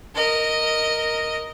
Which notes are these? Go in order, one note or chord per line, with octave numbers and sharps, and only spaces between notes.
A#4 D#5